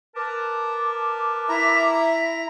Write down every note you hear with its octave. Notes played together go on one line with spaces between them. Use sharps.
A#4 B4 A5 D6
E4 E5 A#5